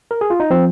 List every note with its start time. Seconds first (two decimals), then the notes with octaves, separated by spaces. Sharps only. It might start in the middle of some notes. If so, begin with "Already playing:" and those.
0.11 A#4
0.21 G#4
0.30 F4
0.40 D#4
0.50 F3 C4